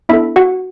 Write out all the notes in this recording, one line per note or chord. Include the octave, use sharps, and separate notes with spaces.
B3 D4 E4 A4 E5
F#4 F#5